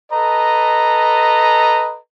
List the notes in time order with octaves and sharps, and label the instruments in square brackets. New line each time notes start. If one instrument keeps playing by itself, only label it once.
[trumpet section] A4 B4 D#5 A#5